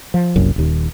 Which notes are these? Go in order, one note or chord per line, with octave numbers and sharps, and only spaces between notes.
F3
F#1 C2 F#2
D#1 D#2